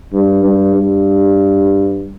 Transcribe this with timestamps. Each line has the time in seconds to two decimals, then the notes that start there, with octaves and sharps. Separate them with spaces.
0.13 G2
0.43 G2
0.75 G2